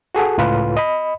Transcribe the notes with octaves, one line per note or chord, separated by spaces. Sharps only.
F#4 G#4 A4 F#5
C#2 A2 F4 B4
D#5 B5